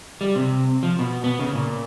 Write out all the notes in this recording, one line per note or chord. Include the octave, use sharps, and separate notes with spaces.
G3
C3
F3
B2
B3
C#3
A#2